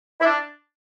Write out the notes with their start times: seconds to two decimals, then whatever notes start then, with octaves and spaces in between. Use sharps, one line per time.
0.20 E4
0.25 D4